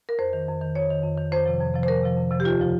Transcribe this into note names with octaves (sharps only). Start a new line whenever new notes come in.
A#4
F2 C5
D#3
F2
D#3
F2 C#5
D#3
F2
D#3
F2 C5
C3 F3
F2
C3 F3
C5
F2 A#4
C3 F3
F2
C3 F3
G4
D#2 F4
C#3 F3